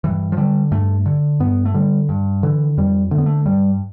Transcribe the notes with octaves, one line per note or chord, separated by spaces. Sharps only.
G2 E3
F3
D3 G3
G2 A3
D3
G2 B3
A3
D3 G3
G2
D3 E3
F2 G3
D3 A3
B3
A3
G2 G3